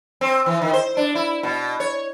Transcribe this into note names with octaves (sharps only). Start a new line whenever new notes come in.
C4
E3
D#3
C5
D4
E4
B2
C#5